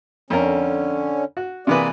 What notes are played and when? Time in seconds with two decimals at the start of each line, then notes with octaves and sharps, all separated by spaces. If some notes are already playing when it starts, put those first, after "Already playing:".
0.30 F2 D3 C#4 A#4
1.37 F#4
1.67 C3 E3 A#3 G#4 B4 D5